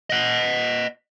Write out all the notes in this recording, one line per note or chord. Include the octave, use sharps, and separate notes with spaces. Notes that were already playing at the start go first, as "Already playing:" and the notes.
D#5 F#5